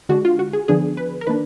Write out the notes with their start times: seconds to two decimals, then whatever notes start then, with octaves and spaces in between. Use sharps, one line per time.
0.09 D3 G#3 D4 F#4
0.25 F4
0.39 F#4
0.53 G#4
0.68 D3 F3 B3 D4 G#4
0.97 B4
1.21 A#4
1.27 D#3 A#3 D4 B4